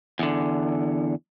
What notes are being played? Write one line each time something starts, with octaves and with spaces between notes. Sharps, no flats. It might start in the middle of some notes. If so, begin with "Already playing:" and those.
E2 D3